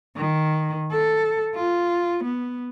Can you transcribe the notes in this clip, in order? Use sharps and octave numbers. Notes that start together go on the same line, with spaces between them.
D#3
A4
F4
B3